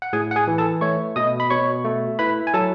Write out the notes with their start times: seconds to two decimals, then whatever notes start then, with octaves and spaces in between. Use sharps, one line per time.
0.02 F#5
0.13 A2 G#4 G#5
0.31 F#5
0.36 G#4 G#5
0.48 E3
0.58 A4 A5
0.81 A3 C#5 C#6
1.16 B2 D#5 D#6
1.40 B5
1.50 B2 C#5 C#6
1.85 A3
2.19 E4 B4 B5
2.47 G#5
2.54 F#3 A4 A5